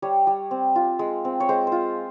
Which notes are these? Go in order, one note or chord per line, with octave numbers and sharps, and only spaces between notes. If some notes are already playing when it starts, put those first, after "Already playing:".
G3 C#5
G3
C4
F4
G#3
C4
C#5
G#3 C5
F4 C5